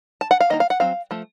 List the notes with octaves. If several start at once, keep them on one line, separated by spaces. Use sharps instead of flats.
A5
F#5
F5
D#3 A#3 D#4 D#5
F5
F#5
F#3 C4 F5
F3 A3